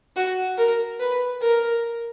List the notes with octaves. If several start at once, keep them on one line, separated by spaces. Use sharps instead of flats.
F#4
A#4
B4
A#4